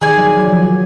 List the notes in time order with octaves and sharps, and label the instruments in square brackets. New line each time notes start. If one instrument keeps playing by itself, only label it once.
[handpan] D#3 [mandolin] G#4 D5 G#5
[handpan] F#3
F#3
F3
F#3